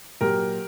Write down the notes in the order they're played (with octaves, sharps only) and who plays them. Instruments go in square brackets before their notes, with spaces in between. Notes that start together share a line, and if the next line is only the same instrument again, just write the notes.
[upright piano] A#2 F#3 G4 A#4